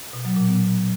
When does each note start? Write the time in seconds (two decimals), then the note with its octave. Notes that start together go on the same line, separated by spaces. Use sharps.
0.13 B2
0.25 F#3
0.36 A#2
0.48 B3